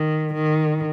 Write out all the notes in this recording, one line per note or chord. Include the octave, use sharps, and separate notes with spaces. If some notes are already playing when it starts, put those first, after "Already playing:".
Already playing: D#3
D#3